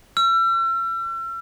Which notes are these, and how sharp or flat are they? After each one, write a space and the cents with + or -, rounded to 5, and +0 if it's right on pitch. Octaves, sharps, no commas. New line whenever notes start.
E6 +45